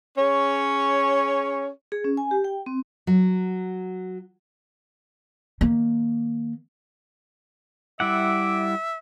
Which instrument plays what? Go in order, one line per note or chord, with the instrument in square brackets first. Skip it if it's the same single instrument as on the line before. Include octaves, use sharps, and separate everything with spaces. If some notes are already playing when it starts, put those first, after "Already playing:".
[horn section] C#4 G#4 C#5
[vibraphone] G#4
C#4
G#5
G4
G5
C4
[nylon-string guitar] F#3
[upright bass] D#3 A#3
[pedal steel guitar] G3 E4 F#5 [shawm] E5 [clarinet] D6